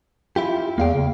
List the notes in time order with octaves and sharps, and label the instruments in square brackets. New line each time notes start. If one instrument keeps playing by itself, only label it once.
[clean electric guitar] E4 F4 G4
[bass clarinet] E2 [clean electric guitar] A#3 F5 G5
[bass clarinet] C#3